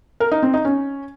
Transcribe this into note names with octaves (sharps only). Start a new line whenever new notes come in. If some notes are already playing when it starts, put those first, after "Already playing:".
A#4
D#4
C4
D#4
C#4